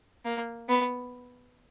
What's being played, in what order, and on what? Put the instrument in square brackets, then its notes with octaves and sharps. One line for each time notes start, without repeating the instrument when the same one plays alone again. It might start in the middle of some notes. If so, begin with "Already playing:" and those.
[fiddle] A#3
B3